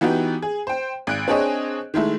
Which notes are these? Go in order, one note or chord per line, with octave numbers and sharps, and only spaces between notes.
E3 B3 D#4 F#4 G4
G#4
C5 G5
G#1 F#6 D7
C4 D4 G#4 C#5 D#5
D#3 G#3 A3 E4